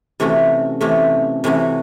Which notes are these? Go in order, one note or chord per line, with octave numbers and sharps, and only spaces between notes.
C3 E3 A3 C#4 F#4
C3 E3 A3 C#4 F#4
C3 E3 A3 C#4 F#4